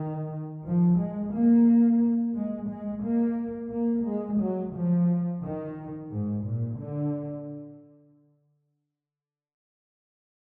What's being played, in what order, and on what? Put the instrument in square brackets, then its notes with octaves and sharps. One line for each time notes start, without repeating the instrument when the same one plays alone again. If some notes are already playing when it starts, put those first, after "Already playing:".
Already playing: [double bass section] D#3
F3
G#3
A#3
G#3
G#3
A#3
A#3
G#3
F#3
F3
D#3
G#2
A#2
D3